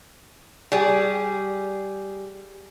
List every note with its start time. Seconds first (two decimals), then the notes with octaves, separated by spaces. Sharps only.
0.72 G3 G#4